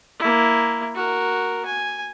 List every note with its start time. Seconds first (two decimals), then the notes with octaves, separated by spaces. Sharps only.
0.20 A#3 E4
0.95 F#4 A#4
1.66 G#5